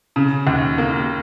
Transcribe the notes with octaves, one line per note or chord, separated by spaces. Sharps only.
C#3
D#2
A#3